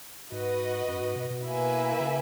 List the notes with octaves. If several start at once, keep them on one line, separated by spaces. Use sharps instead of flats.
G#2 F#4 B4 D#5
F#2
G#2
B2
B2
A#3 E4 B4 E5 G#5
C#3